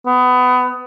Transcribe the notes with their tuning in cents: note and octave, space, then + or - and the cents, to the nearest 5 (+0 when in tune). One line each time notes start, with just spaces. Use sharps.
B3 +25